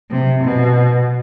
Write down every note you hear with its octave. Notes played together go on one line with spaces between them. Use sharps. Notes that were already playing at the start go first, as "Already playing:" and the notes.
C3
B2